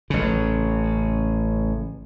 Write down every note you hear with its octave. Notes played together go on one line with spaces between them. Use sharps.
A1 C#3